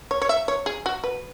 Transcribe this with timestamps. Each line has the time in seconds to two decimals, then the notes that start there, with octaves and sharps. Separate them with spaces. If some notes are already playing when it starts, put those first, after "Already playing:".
0.11 C#5
0.22 C#5
0.29 E5
0.48 C#5
0.66 G#4
0.86 F#4
1.04 B4